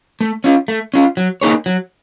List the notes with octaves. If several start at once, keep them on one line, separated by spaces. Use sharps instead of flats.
A3
C#4 F4
A3
C#4 F4
F#3
A#3 D#4 G#4 C#5
F#3